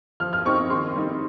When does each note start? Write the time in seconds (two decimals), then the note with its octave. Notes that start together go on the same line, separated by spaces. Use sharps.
0.20 F3 F6
0.33 F6
0.45 C4 D#4 C#6
0.70 D#3 C6
0.96 G3 C4 D#4